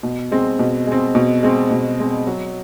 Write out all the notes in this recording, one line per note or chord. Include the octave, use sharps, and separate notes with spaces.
B2
G#3 C4
B2
G#3
C4
B2
G#3 C4
B2
G#3 C4
F#3